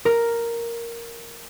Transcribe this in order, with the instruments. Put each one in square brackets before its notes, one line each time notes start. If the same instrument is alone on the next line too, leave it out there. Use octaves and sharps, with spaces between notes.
[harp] A#4